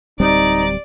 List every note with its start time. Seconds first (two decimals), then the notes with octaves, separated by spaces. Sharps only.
0.20 D1 G3 C4 D#4 D5